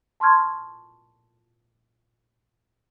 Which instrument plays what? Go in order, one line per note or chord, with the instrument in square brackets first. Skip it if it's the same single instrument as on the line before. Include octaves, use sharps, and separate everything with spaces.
[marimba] A5 C6 C#6 F6 G#6